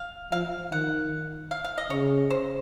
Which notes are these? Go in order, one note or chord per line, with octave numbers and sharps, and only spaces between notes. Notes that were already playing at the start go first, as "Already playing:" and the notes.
Already playing: F5
F3 F5
D#3 F#5
F5
F5
D#5
C#3 C#5
C5